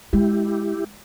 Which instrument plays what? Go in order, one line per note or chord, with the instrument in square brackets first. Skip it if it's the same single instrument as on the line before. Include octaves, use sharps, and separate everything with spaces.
[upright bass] G#3 [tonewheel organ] E4 G4